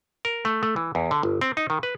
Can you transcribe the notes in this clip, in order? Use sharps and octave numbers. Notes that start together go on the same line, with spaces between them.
A#4
A3
A3
E3
E2
D3
G1
C4
D#4
D#3
B4